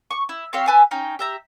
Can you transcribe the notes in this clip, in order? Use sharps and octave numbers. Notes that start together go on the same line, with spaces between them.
C#6
E4
C4 G4 C#5 F5
B4 E5 G#5 A5
C#4 D#4 G5
G4 E5 A#5